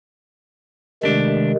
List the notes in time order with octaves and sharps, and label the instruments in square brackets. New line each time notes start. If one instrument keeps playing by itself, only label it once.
[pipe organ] C3 D#3 G#3 [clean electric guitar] A3 D4